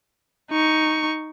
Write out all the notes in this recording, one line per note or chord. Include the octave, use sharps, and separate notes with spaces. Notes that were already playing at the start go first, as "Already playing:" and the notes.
D#4 C#6